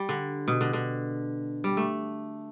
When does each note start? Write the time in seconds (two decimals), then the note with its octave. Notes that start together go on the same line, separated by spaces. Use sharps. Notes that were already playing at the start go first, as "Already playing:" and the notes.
Already playing: G3
0.09 D3
0.48 B2
0.61 D3
0.73 D3
1.64 G3
1.77 A3